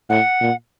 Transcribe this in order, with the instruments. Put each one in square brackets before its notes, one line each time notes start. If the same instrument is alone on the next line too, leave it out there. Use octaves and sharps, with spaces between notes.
[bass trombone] A2 [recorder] F#5
[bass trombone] A#2